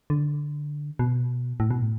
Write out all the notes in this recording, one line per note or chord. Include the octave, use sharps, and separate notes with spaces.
D3
B2
A2
B2
A2